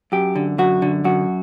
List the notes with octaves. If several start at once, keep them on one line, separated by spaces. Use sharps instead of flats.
F#2 G4
D3
F#2 F#4
D3
F#2 F#4